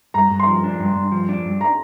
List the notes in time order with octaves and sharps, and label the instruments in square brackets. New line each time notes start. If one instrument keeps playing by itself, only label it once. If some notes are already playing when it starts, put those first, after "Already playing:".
[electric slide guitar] G2 [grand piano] A#5
[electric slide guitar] G2
[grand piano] C6
[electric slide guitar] F3
D4
G2
G2
F3
D4
G2
[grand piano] A#5